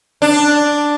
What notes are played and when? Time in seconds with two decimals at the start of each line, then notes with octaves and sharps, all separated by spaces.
0.22 D4